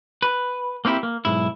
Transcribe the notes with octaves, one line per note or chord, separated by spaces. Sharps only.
B4
A#3 C4 D#4 E4 G4
A#3
B1 G#2 E4